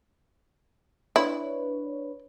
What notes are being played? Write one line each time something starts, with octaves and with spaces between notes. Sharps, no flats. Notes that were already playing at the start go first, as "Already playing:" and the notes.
D4 E4 B4 C#5